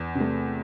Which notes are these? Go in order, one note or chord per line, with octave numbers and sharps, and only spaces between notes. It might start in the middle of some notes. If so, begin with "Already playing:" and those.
Already playing: E2
C3
A3